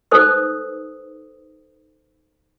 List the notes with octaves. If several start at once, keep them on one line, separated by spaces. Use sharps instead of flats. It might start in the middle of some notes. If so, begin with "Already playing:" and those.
D#4 A4 B4 C5 D#6 E6